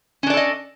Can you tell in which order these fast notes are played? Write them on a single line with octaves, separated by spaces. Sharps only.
C#4 D4 D5 A4 D#5